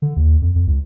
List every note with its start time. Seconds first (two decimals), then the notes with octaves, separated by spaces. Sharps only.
0.02 D3
0.17 D#2
0.42 F2
0.55 F2
0.67 C#2